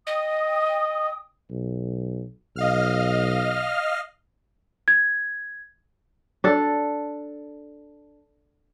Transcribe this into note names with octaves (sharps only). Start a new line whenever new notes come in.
D#5 G5 D#6
B1
B1 D#5 F5 F6
G#6
D4 A4